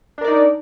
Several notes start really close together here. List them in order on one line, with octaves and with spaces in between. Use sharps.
D4 A#4 D5 D#4